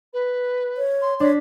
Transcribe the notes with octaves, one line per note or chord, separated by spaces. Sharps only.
B4
C#5
C6
D4 C#5 B6